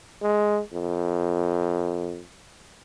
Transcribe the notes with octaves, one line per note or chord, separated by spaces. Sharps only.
G#3
F2